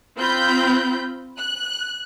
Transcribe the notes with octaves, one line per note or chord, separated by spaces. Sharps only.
C4 F4 B5 G6
F#6